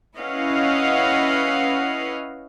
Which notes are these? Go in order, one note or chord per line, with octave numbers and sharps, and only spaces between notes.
C#4 E4 B4 D#5 F5 F#5